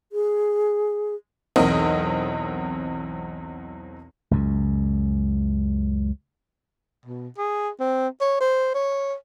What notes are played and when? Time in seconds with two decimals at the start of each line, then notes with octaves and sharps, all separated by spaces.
0.12 G#4
1.56 B1 E2 C4 A#4 D#5
4.31 C#2 F#2
7.06 B2
7.38 G#4
7.80 C4
8.21 C#5
8.40 C5
8.75 C#5